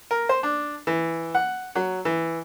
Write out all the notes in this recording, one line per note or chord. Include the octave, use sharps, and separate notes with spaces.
A#4
C5
D4
E3
F#5
F#3
E3